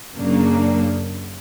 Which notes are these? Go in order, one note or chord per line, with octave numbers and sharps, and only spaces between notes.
F#2 C#3 F#3 A#3 D4